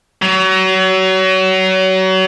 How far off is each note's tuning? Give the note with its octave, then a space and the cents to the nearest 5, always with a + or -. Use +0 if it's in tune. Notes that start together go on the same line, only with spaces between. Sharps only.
F#3 +30